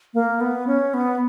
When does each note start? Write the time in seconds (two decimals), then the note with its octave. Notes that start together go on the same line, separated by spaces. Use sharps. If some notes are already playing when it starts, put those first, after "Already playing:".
0.14 A#3
0.40 B3
0.67 C#4
0.94 B3